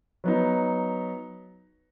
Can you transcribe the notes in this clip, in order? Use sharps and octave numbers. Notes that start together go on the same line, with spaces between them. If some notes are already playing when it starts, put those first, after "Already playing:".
F#3 B3 D#4